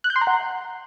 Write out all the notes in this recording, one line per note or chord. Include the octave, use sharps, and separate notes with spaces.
F#6
G6
C6
A#5
F#5